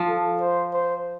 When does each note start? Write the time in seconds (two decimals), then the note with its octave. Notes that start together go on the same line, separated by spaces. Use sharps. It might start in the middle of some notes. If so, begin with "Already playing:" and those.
Already playing: F3
0.08 A4
0.40 C5
0.73 C5